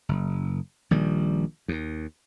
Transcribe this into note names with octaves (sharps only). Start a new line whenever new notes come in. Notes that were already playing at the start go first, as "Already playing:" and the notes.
F#1
A#1 D#3 G3
D#2